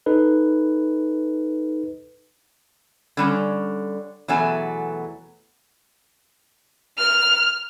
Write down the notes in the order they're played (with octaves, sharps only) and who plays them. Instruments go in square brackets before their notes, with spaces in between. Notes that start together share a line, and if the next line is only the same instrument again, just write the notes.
[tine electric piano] D#4 A4 B4
[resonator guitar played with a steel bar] D3 G3 C#4
E2 B2 F#3 A3 E5 G#5
[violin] F6